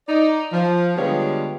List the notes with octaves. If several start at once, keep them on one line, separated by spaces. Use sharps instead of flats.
D#4 D5
F3
D3 G3 G#3 B3 F4 C#5